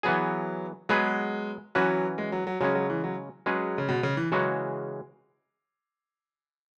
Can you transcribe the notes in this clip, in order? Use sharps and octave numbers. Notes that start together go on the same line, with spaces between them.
E3 F#3 B3 G#4
F#3 G#3 B3 G#4 B4
E3 F#3 C#4 F#4 B4
G#3
F#3
F#3
C#3 F#3 G#3 C#4
F#3
E3
F#3
F#3 G#3 C#4 G#4 B4
C#3
B2
C#3
E3
C#3 E3 F#3 G#3 C#4 F#4